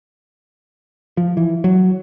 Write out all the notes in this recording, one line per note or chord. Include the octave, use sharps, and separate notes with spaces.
F3
E3
F#3